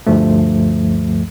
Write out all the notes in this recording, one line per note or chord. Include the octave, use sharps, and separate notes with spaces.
D2 G2 F3 A3